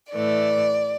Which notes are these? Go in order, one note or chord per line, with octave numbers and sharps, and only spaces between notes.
A2 E3 A3 D5